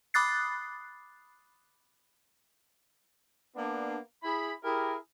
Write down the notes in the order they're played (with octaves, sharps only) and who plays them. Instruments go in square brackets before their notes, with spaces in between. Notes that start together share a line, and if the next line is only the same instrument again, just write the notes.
[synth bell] B5 D6 D#6 F#6 A6 C7
[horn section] A#3 B3 D4
E4 G#4 B5
E4 G4 G#4 A#4